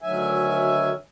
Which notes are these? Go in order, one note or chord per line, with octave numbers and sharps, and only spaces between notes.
D2 D#3 F#3 E5 G#5